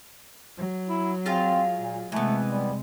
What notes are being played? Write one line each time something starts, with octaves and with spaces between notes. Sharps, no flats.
F#3
E4
G#3 C4 F4 F5
A#2
C3 E3 G#3 A3 B3
G3